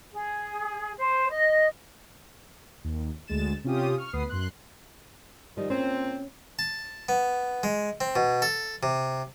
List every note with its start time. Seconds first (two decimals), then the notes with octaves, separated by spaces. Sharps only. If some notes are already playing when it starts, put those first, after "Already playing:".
0.13 G#4
0.98 C5
1.30 D#5
2.84 D#2
3.27 D2 G#3 A6 E7
3.64 C3 C#4 F4 G4 D#6
3.98 C#6 F6
4.13 D2 B3 B4 D#6 C7
4.29 F#2 C6 F#6
5.57 D#3 F3 G3 D#5
5.70 A#2 C4 C#4
6.59 A5
7.09 B3
7.63 G#3
8.01 C4
8.16 B2
8.42 A4
8.83 C3